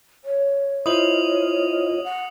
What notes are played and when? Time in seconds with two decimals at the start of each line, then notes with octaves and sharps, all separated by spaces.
0.25 C#5
0.86 E4 F4 C5 D#5 D#6 F#7
2.04 F#5